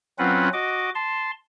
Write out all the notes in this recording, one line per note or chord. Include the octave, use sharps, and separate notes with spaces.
F#3 C4 C#4 F4 B4 F#5
F#4 D#5 D6
A5 C6